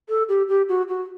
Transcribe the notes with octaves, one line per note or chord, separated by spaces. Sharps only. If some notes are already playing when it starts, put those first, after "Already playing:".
A4
G4
G4
F#4
F#4